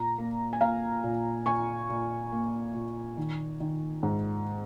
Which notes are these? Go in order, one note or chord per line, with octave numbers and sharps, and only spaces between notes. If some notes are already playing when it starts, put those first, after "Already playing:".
Already playing: A#2 A#5
A#3
G#5
A#3 F5 A#5
A#2
A#2 G#5 C#6
A#2
A#3
A#2
D#3
D#3
G#2